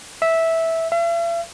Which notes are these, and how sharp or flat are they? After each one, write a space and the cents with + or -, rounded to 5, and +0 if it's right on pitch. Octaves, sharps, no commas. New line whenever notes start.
E5 -10
E5 +45